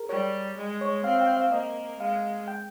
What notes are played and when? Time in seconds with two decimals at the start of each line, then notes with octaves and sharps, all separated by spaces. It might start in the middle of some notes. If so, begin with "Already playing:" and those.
Already playing: G#4 A#4
0.09 G3 C#5
0.57 G#3
0.81 C#5
1.04 C4 F5
1.16 F5
1.21 G5
1.37 F5
1.52 A#3 D#5
1.99 G#3 F5
2.48 G5